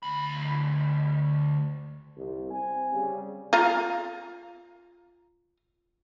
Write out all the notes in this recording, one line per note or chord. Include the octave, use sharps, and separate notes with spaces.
D2 B5
C2
C4 G#5
C#3 G3
F4 F5 A#5